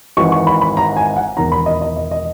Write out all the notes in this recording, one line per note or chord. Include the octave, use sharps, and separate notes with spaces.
G#1 G#2 E3 C#6
C#6
B5
B5
A#5
G#5
F#5
E1 E2 D#3 A#5
B5
D#5
D#5
D#5
D#5